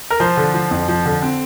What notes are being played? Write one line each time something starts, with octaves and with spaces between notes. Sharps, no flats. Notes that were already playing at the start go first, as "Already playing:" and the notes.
A#4
F3 C5
D3
F3
F2
F3
D3
C4